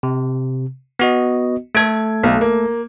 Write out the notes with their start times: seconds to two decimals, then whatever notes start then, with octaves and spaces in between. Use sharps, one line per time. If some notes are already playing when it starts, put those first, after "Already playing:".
0.03 C3
0.99 B3 F#4 D#5
1.75 A3 A4 G#6 D7
2.23 B1
2.41 A#3